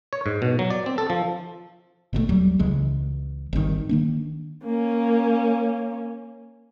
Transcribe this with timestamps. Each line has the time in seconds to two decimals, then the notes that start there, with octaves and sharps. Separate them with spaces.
0.13 C#5
0.26 G#2
0.42 B2
0.59 F#3
0.70 D5
0.86 C4
0.98 A4
1.10 F3
2.13 G#1 B2 D3 A3
2.29 D#2 F#3 G3
2.59 C#2 C#3 E3 G#3
3.53 G#1 G2 C3 D#3
3.89 D#3 A#3 D4
4.63 A#3 C#4